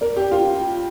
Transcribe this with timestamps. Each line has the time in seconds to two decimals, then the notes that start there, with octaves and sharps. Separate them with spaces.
0.01 A#4 D5
0.16 G4
0.22 G5
0.32 F4
0.42 F4
0.61 F4